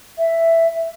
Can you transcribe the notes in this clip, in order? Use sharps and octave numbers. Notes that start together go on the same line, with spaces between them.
E5